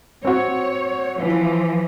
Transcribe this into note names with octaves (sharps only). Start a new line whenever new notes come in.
C4 F#4 C#5
E3 F3